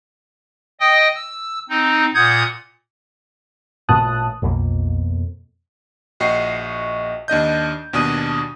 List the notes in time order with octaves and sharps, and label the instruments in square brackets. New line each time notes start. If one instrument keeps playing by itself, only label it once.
[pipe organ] D#5 G5 D#6
E6
C4 D#4
A#2 F#5 D#6 G6 G#6
[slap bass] A1 A#2 A3 [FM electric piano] A5 D#6 F#6
[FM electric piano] B1 [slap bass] F2 B2 A#3
[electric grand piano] A#1 F#4 D#5 G5 C#6 C7
D#2 D4 D#5 G6
D#2 B2 D4 G#5 D#6 D#7